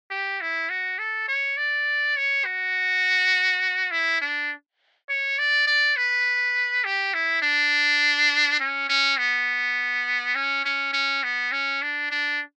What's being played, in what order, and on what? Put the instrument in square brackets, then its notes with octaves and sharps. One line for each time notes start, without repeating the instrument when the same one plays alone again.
[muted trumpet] G4
E4
F#4
A4
C#5
D5
C#5
F#4
E4
D4
C#5
D5
D5
B4
G4
E4
D4
C#4
C#4
B3
C#4
C#4
C#4
B3
C#4
D4
D4